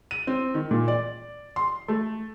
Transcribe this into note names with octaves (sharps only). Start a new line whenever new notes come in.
D#7
C4
D#3
A#2
D5
C6
A3